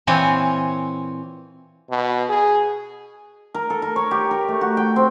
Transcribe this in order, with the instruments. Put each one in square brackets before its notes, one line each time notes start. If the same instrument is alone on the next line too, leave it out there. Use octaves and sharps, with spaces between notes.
[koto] A#2 E3 C4 C#5 G#5
[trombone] B2
G#4
[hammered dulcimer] A#4
A4
A#4
C#5
G4
A#4
A3
F#4
G5
C4